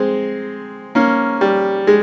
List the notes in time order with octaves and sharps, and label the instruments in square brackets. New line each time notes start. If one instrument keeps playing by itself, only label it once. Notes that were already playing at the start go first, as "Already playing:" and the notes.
Already playing: [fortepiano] G#3 C4
A#3 C#4
G3
G#3